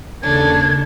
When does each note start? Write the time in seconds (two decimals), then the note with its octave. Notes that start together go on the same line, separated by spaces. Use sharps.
0.22 D#2 C#3 D4 A4 G#6